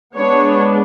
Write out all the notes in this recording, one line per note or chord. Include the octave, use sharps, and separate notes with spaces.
G#3 B3 D4 C#5